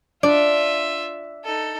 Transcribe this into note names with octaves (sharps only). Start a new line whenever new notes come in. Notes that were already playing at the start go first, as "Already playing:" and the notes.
D4 F4 D5 E5
D#4 A4